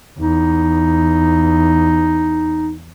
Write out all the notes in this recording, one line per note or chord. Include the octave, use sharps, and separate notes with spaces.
E2 D#4